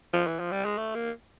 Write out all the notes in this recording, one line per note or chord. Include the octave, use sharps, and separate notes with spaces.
F3
E3
F3
G3
G#3
A3
A#3